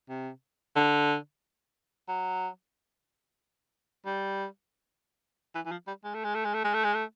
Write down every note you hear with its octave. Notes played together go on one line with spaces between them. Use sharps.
C3
D3
F#3
G3
E3
E3
F3
G3
G#3
A3
G#3
A3
G#3
A3
G#3
A3
G#3
A3